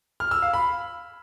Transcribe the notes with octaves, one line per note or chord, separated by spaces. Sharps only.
F6
E6
F5
B5